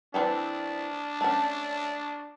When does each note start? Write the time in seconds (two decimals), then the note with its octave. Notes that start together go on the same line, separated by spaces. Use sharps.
0.14 E3 C4 D4 A4
1.21 A3 C#4